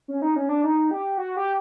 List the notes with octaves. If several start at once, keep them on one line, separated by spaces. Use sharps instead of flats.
C#4
D#4
C#4
D4
D#4
G4
F#4
G4